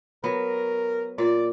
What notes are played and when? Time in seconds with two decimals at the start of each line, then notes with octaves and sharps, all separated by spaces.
0.24 F#3 B3 A#4
1.18 A#2 D5